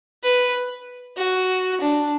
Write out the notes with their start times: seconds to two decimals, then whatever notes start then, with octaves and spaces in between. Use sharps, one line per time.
0.23 B4
1.17 F#4
1.81 D4